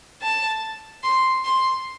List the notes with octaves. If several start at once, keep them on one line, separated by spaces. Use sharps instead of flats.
A5
C6
C6